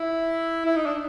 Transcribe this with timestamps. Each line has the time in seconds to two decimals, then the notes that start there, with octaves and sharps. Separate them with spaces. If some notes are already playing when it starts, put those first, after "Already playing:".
Already playing: E4
0.66 E4
0.76 D#4
0.86 D4